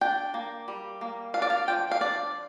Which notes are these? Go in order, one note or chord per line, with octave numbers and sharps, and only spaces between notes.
D4 G5
A#3
G3
A#3
D4 F5
D5
F5
F3 G5
F5
D4 D5